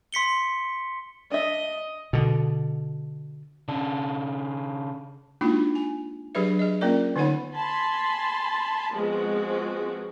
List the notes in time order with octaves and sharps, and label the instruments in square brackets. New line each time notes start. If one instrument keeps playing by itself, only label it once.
[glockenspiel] C6 B6 C#7 G7
[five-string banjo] D4 E5 [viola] D#5
[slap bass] B2 D3
[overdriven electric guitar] C#3 D4
[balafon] G#3 A#3 D4 D#4 F4 F#4
G#5
F#3 D4 G4 G#4 B4 E5
G#4 D#5
A#3 C#4 F4 A#4 D5 E5
D3 B3 D#4 C#5 F#5 B5
[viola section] G#5 A5 B5 C6
F3 G#3 B3 C4 F#4